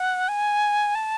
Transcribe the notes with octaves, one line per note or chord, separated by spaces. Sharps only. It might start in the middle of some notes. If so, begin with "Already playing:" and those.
Already playing: F#5
G#5
A5